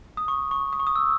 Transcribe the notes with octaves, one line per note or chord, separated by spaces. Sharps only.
D#6
C#6
C#6
D#6
C#6
D#6
E6